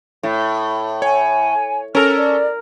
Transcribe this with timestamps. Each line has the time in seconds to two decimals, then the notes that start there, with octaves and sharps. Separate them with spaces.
0.23 A2
1.02 C#5 G#5
1.95 C#4 A4 A#4 F6
2.16 D5